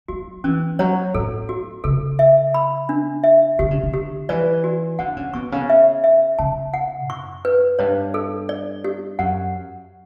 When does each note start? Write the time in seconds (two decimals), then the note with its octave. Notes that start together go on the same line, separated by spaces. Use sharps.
0.08 F#3 F#4
0.44 E3 C#4
0.79 F#3 C#5
1.14 A2 A4
1.49 F#4
1.84 C#3 A4
2.19 E5
2.54 B5
2.89 D4
3.24 E5
3.59 D3 G4
3.71 C#3
3.83 D3
3.94 G4
4.29 E3 D5
4.64 F#4
4.99 D3 F#5
5.17 C#3
5.34 B2 C#6
5.52 C#3
5.70 E5
6.04 E5
6.39 C#3 A5
6.74 F#5
7.09 F#2 C#6
7.45 B4
7.79 G2 C#5
8.14 A4
8.49 D5
8.84 G4
9.19 F#2 F#5